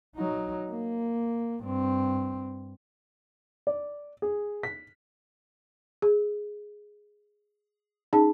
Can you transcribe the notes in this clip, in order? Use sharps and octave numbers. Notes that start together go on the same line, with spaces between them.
F#3 D#4
A#3
G2 C4
D5
G#4
B6
G#4
C#4 D#4 G#4 A5